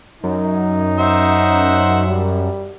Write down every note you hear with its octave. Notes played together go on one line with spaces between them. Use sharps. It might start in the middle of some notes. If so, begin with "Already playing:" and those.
F#2 D#4
C5 E5 F#5
G3